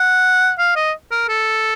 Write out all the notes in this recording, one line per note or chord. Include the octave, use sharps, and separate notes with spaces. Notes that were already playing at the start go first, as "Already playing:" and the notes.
Already playing: F#5
F5
D#5
A#4
A4